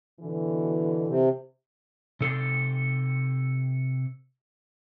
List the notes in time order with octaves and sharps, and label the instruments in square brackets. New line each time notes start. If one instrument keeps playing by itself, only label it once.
[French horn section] B2 D3 E3
[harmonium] C3
[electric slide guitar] C3 A4 C5 D5